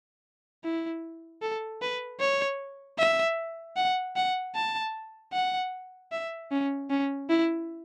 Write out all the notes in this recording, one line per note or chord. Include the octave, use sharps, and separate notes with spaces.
E4
A4
B4
C#5
E5
F#5
F#5
A5
F#5
E5
C#4
C#4
E4